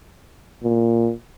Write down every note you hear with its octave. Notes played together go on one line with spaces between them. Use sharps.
A#2